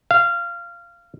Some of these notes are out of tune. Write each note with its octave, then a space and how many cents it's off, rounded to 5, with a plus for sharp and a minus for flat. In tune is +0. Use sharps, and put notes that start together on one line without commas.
F5 -20